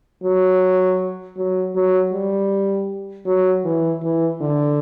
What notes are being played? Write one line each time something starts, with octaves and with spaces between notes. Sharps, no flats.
F#3
F#3
F#3
G3
F#3
E3
E3
D3